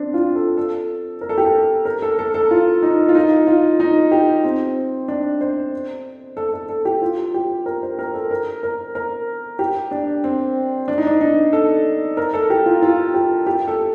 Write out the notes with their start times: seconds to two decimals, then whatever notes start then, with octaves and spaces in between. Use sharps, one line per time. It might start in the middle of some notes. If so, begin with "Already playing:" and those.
Already playing: C4 D4
0.14 F4
0.35 A4
0.57 A4
1.21 A#4
1.29 A4
1.38 G4
1.46 A4
1.85 A#4
2.02 A4
2.19 A4
2.34 A4
2.51 F4
2.83 D#4
3.09 F4
3.15 D#4
3.47 F4
3.80 D#4
4.12 G4
4.44 C4
5.08 D4
5.41 C5
6.37 A4
6.53 A4
6.69 A4
6.85 G4
7.02 F4
7.34 G4
7.66 A#4
7.83 C5
7.99 A#4
8.14 A4
8.31 A#4
8.63 A#4
8.95 A#4
9.59 G4
9.91 D4
10.24 C4
10.88 D4
10.98 D#4
11.07 D4
11.21 D#4
11.53 A4
12.17 A#4
12.33 A4
12.50 G4
12.66 F4
12.82 F4
13.14 G4
13.47 G4
13.67 A4